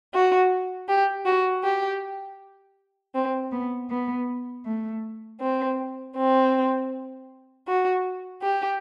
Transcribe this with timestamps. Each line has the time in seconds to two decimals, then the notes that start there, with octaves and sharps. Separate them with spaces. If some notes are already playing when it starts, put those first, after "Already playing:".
0.13 F#4
0.88 G4
1.25 F#4
1.63 G4
3.14 C4
3.52 B3
3.89 B3
4.65 A3
5.40 C4
6.16 C4
7.67 F#4
8.42 G4